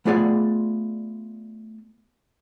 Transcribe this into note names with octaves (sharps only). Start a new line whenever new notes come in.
A3 B3 F4 G#4 D5 F#5